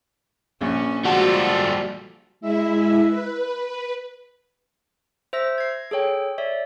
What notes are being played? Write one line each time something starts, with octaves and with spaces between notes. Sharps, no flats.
A#1 C#4
F3 G3 G#3 F4 F#4 A4
G#3 E4 E5
B4
C5 E5 E6 A#6
G#6 C7
G#4 A4 C#5 G5
C#5 D5 E5